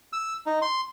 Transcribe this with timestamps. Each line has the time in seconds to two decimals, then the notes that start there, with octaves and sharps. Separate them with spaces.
0.13 E6
0.46 D#4
0.62 C6